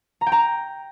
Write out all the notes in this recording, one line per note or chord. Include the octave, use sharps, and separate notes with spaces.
A#5
G5
A#5